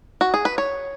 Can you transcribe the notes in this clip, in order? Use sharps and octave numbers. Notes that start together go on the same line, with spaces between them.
F#4
G#4
B4
C#5